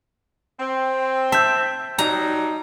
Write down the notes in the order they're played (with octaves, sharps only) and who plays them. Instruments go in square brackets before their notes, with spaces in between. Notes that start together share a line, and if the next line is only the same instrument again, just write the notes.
[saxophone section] C4
[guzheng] E5 [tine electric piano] A5 G6
[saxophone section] F#3 G3 D#4 [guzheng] A#5